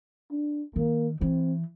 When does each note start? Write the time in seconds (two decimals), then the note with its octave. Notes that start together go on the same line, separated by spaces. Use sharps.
0.31 D4
0.76 D#3 A#3
1.21 E3 C4